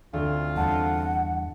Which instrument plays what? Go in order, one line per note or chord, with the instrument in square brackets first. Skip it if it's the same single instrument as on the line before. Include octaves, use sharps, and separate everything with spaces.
[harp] D2 [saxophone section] C4 F4
[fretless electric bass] E2 G2 [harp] D#5 A5 [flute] F#5